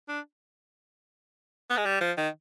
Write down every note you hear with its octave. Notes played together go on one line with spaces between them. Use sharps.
D4
B3
G#3
G3
F3
D#3